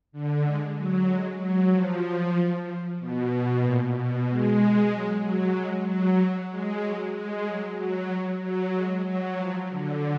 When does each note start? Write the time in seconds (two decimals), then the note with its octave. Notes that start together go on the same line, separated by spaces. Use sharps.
0.12 D3
0.44 G#3
0.76 F#3
1.08 G#3
1.40 F#3
1.72 F3
3.00 B2
3.64 A#2
3.95 B2
4.28 G#3
4.91 F#3
5.23 F#3
5.55 G#3
5.87 F#3
6.51 G#3
6.83 F#3
7.15 G#3
7.47 F#3
7.78 F#3
8.43 F#3
8.75 G#3
9.06 F#3
9.38 F3
9.70 D3